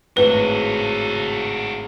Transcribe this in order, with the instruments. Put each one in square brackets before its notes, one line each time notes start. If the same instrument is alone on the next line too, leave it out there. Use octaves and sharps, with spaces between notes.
[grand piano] G#1 A2 [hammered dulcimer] C#3 [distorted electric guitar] F#4 A4 [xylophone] B4